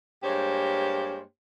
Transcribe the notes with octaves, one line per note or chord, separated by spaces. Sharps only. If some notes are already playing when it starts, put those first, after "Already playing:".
G2 G#3 A#3 G4 C5 C#5